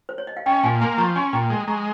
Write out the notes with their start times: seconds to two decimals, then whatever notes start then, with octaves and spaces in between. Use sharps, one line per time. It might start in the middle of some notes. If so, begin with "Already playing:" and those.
0.09 C5
0.18 C#5
0.27 D#5
0.37 F5
0.46 C#4 D#5 G5
0.64 A#2 F5 G#5
0.80 A#3 G#5 C6
0.98 F3 A#5 C#6
1.16 C#4 G#5 C6
1.33 A#2 G5 A#5
1.50 G#3
1.67 G#3 A#5 C#6